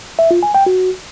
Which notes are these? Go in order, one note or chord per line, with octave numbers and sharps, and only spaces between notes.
E5
F4
G#5
G5
F#4